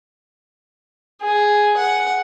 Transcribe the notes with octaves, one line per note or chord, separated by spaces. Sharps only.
G#4
F#5